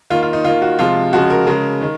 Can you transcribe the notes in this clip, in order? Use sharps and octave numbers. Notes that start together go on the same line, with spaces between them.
D#3 A#3 F4
F4
D#4
D#3 A#3 F4
F#4
C3 F3 G#3 F4
C#3 F3 G#3 F#4
A#4
C#3 G#3 A#4
D#3